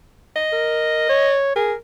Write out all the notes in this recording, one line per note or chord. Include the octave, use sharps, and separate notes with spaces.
D#5
A#4
C#5
G#4 A#4